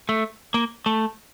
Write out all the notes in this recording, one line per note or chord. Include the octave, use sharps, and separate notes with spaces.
A3
A#3
A3